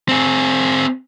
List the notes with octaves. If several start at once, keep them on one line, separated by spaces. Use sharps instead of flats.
C4 G#4